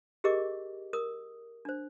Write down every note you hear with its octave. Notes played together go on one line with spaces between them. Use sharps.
G4 G#4 A#4 D#5 D6
A#4 D#6
D4 C5